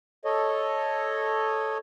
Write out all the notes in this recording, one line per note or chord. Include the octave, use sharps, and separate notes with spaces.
A4 C#5 D#5